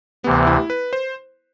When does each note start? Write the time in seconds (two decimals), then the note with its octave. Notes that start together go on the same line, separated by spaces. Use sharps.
0.24 D2 C3 E3 B3
0.47 E4
0.70 B4
0.93 C5